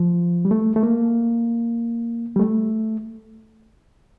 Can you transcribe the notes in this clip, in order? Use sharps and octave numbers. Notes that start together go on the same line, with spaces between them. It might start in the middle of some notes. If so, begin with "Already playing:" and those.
Already playing: F3
G3
A3
A3
A#3
G3
A3